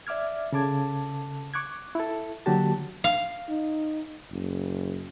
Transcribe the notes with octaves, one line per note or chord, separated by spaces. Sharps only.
D5 E5 D6 F6 G#6
C#3 A4 A5 D6 G#6
C#6 D6 F#6 G#6
E4 A4
D3 F#3 A#3 F#4 G4 A5
F5
D#4
F#1